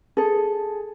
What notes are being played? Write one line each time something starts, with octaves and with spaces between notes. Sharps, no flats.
G#4 A4